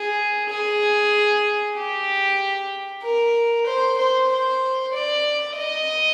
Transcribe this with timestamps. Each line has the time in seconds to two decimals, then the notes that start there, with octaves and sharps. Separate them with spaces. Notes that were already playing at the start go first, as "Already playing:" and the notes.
Already playing: G#4
0.49 G#4
1.76 G4
3.03 A#4
3.67 C5
3.98 C5
4.29 C5
4.93 D5
5.57 D#5